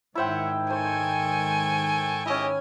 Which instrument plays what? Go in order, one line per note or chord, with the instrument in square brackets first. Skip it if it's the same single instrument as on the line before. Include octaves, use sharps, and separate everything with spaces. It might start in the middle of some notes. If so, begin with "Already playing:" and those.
[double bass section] G#2 D#3 [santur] E4 C5 G5 [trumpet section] C#5 E5 F#5
[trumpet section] A4 G5 C#6 [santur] C5 [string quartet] G#5
[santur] C#4 E4 [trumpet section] G4 G#4 D#5